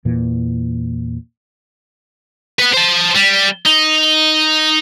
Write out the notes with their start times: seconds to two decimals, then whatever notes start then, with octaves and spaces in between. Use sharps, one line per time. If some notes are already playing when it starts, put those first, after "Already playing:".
0.05 E2 A#2 E3
2.59 B4 F#5
2.74 C5 A5
3.16 G3
3.66 D#4